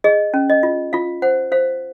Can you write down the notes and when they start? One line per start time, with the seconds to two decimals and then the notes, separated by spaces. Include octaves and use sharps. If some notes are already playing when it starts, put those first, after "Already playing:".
0.04 G#4 D#5
0.34 C#4
0.50 D#5
0.63 F4
0.93 F4 F5
1.22 C5 F#5
1.52 C5 F5